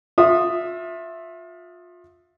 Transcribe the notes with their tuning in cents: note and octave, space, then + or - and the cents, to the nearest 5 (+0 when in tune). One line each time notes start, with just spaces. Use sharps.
F4 +30 E5 +0 D#6 -10